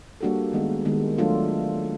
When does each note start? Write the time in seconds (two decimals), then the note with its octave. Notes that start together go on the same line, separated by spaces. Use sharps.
0.21 G3 A#3 D4 F#4 A4
0.53 D#3 G#3 B3
0.85 D#3 G#3 B3
1.18 F#3 A3 D4 F4 A4